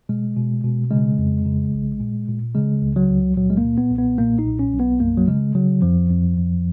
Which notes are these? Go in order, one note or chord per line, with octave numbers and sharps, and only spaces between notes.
B2 G#3
B2
B2
C#3 G#3
F2
C#3
A#1
A#2
A#2
C#3 G#3
C#2
F#3
C#2
A#2 F#3
G#3
A#3
A#2
B3
B1
B3
A#2 A#3
D#4
B1
C#4
B1
B3
F#2 A#3
F#3
C#3 G#3
C#3 F#3
F2 F3
F2
F2